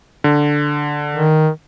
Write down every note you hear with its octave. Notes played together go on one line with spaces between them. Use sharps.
D3
D#3